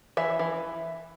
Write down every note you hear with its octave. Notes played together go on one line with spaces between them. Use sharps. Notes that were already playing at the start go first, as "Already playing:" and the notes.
E3 E5
E3